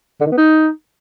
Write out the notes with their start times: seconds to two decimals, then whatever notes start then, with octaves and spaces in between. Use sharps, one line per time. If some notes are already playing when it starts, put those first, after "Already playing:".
0.20 D3
0.26 D#3
0.32 B3
0.37 D#4